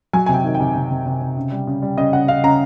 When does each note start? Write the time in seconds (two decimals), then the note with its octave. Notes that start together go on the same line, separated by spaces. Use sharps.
0.13 F#3 G#5
0.26 C3 G#5
0.34 G5
0.44 D#3
0.54 G5
0.60 C3
0.75 C3
0.90 C3
1.06 C3
1.21 C3
1.36 C#3
1.52 G3
1.67 C#3
1.82 G3
1.97 C#3 D#5
2.13 C#3 F#5
2.28 C#3 F5
2.44 C#3 A#5